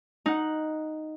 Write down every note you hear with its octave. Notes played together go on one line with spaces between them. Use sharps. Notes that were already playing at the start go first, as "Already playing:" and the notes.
D#4 F#5